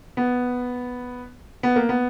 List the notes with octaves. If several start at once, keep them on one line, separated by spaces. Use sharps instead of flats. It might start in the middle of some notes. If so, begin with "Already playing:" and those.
B3
B3
A#3
B3